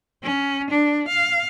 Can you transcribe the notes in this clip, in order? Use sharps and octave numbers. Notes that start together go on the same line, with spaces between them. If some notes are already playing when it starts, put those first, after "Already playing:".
C#4
D4
F5